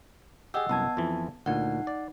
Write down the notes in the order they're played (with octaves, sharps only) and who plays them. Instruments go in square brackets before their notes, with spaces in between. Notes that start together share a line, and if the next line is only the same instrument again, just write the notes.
[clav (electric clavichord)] G4 G#4 [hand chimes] D#5 F#5 E6
[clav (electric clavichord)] C2 F#2 [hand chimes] B3 A5 G#6
[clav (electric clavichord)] F2 E3
[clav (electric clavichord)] D2 A#2 [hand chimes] D#4 F#5
[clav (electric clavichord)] D5